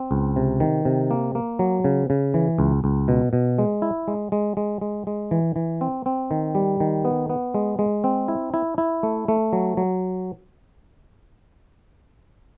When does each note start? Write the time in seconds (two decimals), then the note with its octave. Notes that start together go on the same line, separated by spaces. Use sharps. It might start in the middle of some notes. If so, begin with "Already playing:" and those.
Already playing: C4
0.11 C#2
0.36 C3
0.60 D#3
0.85 C3
1.11 A#3
1.35 A#3
1.59 F#3
1.84 C#3
2.10 C#3
2.34 E3
2.58 C#2
2.84 C#2
3.08 B2
3.33 B2
3.58 G#3
3.82 E4
4.08 G#3
4.32 G#3
4.57 G#3
4.81 G#3
5.07 G#3
5.31 E3
5.56 E3
5.81 C4
6.06 C4
6.31 D#3
6.55 G3
6.80 D#3
7.05 B3
7.30 B3
7.54 G#3
7.79 G#3
8.04 C4
8.28 E4
8.54 E4
8.78 E4
9.03 A3
9.28 A3
9.53 F#3
9.77 F#3